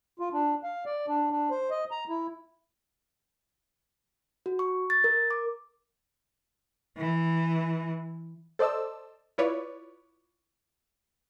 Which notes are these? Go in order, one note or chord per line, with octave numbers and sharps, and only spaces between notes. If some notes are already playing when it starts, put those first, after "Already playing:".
F4
D4
F5
D5
D4
D4
C5
D#5
A#5
E4
F#4
C#6
A6
A#4
D6
E3
A4 C5 D5 D#5 A5 E6
E4 F4 B4 C#5 D5